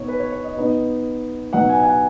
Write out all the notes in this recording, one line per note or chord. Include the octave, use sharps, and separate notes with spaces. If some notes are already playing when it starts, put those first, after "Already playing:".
Already playing: B2 B3 D#4 C#5 D#5
B4
C#5
C#5
D#5
B2 B3 D#4
B2 F#3 D#4 F#5
G#5
G#5
F#5